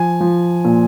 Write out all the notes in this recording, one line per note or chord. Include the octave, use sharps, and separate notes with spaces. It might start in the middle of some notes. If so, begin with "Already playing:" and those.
Already playing: F3 G#5
F3
A#2